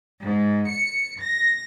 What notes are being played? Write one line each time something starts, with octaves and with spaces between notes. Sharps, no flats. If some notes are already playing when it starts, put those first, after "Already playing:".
G#2
C#7
A#6